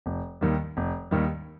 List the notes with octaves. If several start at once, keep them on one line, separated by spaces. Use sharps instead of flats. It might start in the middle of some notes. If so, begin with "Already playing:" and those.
F1
D#2 D#3 G3
F1
D#2 D#3 G3